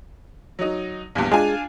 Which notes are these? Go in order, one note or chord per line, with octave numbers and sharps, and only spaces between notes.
F#3 D#4
A#1 E2 G2
G#3 D4 F4 G#5